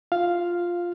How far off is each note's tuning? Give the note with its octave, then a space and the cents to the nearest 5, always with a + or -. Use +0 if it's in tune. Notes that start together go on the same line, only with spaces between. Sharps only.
F4 +0 F5 +0